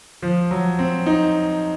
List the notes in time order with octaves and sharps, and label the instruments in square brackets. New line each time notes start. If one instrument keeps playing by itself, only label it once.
[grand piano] F3
F#3
C4
D#4